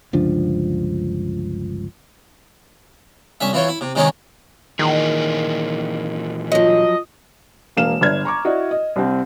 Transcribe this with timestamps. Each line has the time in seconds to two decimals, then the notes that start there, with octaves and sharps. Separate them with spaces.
0.13 G1 C#2 F3 D4
3.41 C2 C#4 E5
3.53 E3 E4 F4 C#5
3.68 E4
3.81 C3
3.95 C3 D#3 G#3 C#4 D#4 C#5
4.79 A#2 D#3 E3 G#4
6.52 F3 F#3 D#5
7.77 E1 A#3 F5 E7
8.01 G1 D5 F6 G#6
8.25 A#5 C#6 D6
8.45 E4 F#4 D5 D#5
8.71 D#5
8.96 C2 C4